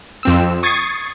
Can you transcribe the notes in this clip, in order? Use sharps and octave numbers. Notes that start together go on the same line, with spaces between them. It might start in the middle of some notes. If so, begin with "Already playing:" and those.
F2 C4 E6
C#6 D#6 G#6 A6 C7